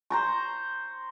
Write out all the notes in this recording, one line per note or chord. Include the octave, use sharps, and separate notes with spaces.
C5 A#5 C#6